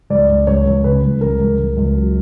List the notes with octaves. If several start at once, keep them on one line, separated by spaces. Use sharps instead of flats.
C#2 D5
C#2
C#2 C#5
C#2
C#3 B4
C#2
C#2 A#4
C#2
C#2
C#2
F#3